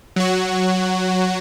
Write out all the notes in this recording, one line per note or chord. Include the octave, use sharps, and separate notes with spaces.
F#3 F#4